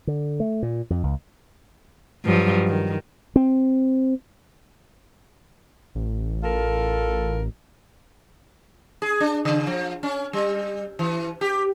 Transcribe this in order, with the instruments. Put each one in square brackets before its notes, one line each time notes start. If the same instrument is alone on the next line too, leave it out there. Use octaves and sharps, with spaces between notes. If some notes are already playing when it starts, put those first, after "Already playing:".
[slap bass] D3
A3
A#2
F2
C#2
[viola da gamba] G2 F3 F#3
D#3
[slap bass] C4
[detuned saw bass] A1
[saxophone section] F4 A4 A#4
[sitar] G#4
D4
C#3
F3
C#4
G3
E3
G4